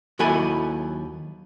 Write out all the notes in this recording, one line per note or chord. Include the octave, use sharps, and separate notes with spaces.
D#2 F#3 E4 A4 G#5 B5